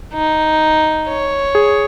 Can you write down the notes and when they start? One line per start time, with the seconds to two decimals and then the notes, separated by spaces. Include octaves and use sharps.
0.14 D#4
1.08 C#5
1.55 G#4